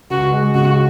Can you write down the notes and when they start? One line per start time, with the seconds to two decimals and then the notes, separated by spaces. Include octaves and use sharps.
0.10 C#2 F#4
0.32 G#3
0.55 C#3 F#4